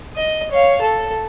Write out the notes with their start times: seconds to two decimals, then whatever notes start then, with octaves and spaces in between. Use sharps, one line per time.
0.16 D#5
0.51 C#5 F5
0.81 A4